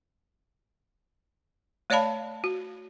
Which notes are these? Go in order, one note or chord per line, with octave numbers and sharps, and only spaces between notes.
A3 C#5 D5 F5 A5 B5
F#4